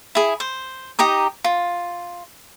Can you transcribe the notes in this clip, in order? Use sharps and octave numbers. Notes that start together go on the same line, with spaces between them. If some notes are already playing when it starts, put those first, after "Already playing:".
E4 G#4
C5
D#4 G4 A#5 D#6
F4